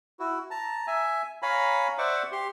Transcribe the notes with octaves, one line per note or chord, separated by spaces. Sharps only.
E4 F#4
A5 A#5
E5 G#5
C#5 F5 G#5 A#5 B5
C5 D5 E5 F#5 C#6 D6
G4 C6